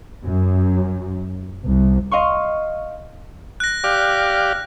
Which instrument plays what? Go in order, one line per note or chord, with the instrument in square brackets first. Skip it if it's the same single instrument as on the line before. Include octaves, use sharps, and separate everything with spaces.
[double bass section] F#2
C2
[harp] D#5 F5 C6 C#6
[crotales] F#6 A#6
[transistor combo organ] G4 D5 F5